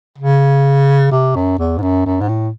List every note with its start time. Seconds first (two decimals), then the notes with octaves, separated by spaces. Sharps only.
0.18 C#3
1.12 C3
1.35 F#2
1.59 E2
1.78 G#2
1.82 F#2
2.06 F#2
2.21 G#2
2.29 A2